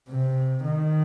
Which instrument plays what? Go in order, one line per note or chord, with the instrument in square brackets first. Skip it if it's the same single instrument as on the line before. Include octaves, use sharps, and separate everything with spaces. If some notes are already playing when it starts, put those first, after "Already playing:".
[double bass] C3
D#3